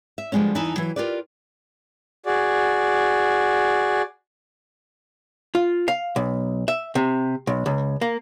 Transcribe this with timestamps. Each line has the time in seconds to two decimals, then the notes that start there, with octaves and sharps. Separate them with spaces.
0.18 E5
0.32 D3 F3 G3 G#3 B3 C#4
0.55 E2 E3 D#4 G#5 A5
0.76 E3 F#3
0.96 F4 G4 A#4 B4 D5
2.26 F#4 G#4 D5
5.55 F4
5.88 F5
6.16 B1
6.68 E5
6.95 C3
7.47 B1
7.66 C#2
8.01 A#3